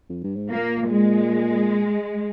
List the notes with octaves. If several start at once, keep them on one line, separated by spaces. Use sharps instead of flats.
F2
G2
G#2
A#2 A#3
G#3